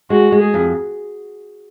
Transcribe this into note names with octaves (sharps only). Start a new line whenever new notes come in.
G#3 F#4
G#3
G#4
F2